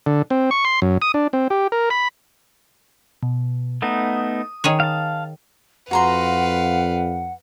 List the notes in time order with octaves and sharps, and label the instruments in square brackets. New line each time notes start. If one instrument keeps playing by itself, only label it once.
[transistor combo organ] D3
C4
C#6
C6
F#2
D#6
D4
C4
G4
A#4
B5
[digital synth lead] B2
[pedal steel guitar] A3 B3 D#4 [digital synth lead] D#6
[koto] D#3 G#4 C#5
[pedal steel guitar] F5 A5
[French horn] F2 [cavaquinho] F#4 A#5 C6 [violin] B4 F5 [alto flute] F#5